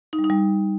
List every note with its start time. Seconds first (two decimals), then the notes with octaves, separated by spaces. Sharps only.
0.13 D#4
0.19 G3
0.24 D#4
0.30 G3